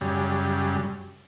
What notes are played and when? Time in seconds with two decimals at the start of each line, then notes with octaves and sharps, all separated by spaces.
0.01 F#2 C#3 G3